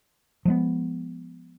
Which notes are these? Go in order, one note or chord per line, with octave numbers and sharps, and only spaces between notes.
F3 G#3 B3